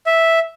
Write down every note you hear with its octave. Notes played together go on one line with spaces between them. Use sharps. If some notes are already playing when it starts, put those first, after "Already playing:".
E5